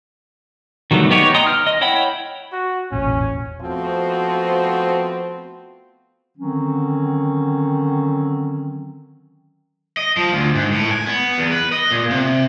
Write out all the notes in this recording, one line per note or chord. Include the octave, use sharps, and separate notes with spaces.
D#3 F#3 G3 A3 B3
B3 D#4 G4 B4 C#5
D#5 G5 A#5 C6 D#6
F6
D#5
E4 C#5 F#5 G5 B5
F#4
E1 A1 A#2 C#4
F3 A3 B3 C4 F#4
D3 D#3 F#3 C4 C#4
D#5
F3
D2
G#2
A2
G#5
B3
E2
B4
D#5
A#2
C3